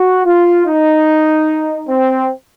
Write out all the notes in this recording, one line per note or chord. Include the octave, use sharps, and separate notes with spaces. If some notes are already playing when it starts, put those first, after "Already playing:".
Already playing: F#4
F4
D#4
C4